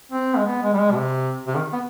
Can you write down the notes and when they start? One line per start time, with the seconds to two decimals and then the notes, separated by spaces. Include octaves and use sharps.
0.12 C4
0.37 G#3
0.46 B3
0.63 G#3
0.73 G3
0.80 G#3
0.91 B2
0.97 C3
1.47 C3
1.55 D#3
1.73 B3